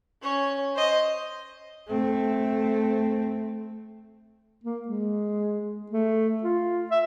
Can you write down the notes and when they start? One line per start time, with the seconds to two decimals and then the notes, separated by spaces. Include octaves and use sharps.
0.22 C#4 C#5
0.75 C5 D#5
1.87 A3 C4
4.64 A#3
4.88 G#3
5.91 A3
6.43 F4
6.91 E5